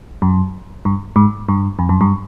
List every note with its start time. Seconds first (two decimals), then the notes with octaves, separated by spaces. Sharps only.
0.22 F#2
0.85 G2
1.16 G#2
1.49 G2
1.79 F2
1.89 F#2
2.01 G2